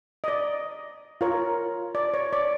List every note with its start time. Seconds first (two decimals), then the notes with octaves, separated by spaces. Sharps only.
0.24 D#5
0.28 D5
1.21 F4 A#4 C#5
1.95 D5
2.14 C#5
2.33 D5